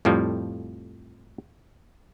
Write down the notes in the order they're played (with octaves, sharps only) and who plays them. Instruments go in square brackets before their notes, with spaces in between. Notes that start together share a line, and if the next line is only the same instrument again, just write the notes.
[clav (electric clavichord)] F2 A2 F3 G3